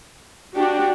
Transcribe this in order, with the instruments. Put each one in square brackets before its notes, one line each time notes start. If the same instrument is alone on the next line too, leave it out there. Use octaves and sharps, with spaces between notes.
[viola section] D4 F#4 [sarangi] G4